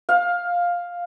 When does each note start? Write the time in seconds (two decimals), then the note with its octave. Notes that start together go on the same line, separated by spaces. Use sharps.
0.09 F5